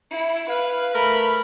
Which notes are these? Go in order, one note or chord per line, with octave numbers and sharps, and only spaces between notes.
E4
B4 F5
A3 A#4 B5